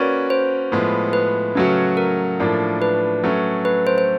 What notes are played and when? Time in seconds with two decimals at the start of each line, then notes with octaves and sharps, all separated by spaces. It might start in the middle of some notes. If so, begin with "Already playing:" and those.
Already playing: A#3 C#4 F#4 B4 C#5 D5
0.30 C5
0.72 A2 F3 G#3 B3
1.13 B4
1.55 C#3 F#3 A3 C#4 F#4
1.97 A#4
2.40 A2 F3 A#3 D4
2.82 B4
3.23 F#3 A3 C#4
3.65 B4
3.87 C5
3.98 C5